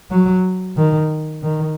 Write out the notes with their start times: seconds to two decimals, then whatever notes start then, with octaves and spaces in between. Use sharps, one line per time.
0.11 F#3
0.77 D#3
1.43 D#3